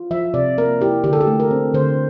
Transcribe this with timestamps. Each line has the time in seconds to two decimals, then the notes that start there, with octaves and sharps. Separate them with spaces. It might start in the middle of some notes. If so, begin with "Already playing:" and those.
Already playing: F4
0.11 F3 E5
0.34 C3 D5
0.58 A#3 A#4
0.81 E4 G4
1.04 D3 G4
1.13 A4
1.21 G4
1.27 A3
1.40 A#4
1.51 C4
1.74 D3 C5